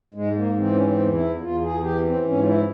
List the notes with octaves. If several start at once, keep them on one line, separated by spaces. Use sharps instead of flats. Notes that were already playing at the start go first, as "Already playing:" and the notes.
G#2 G#3
A#3
E3 C4
C#4
C4
E2
E4
E2 F4
G#4
E3 G4
C4
G#2 C#4
F4
E4